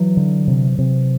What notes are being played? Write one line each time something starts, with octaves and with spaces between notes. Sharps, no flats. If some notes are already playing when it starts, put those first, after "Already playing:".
Already playing: E3 F#3
D3
C3
C3